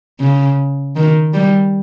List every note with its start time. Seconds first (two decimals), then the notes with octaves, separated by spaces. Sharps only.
0.20 C#3
0.96 D#3
1.34 G3